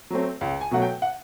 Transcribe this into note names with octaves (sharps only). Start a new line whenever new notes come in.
F#3 A3 C4
C#2
G#5
B2 F#3 A3 F#5
G5
F#5